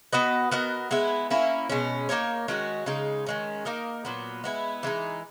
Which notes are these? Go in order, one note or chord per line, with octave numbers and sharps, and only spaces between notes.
B3 F#4 B4 D#5
B3 F#4 A#4 D#5
G#3 B3 E4
A#3 C#4 E4
B2 G#3 C#4
A#3 D#4 A#4 C#5
D#3 G#3 C#4 F#4
C#3 G#3 D#4
D#3 G#3 C#4
A#3 D#4 A#4 D#5
A#2 F#3 B3
G#3 B3 E4
E3 G#3 D#4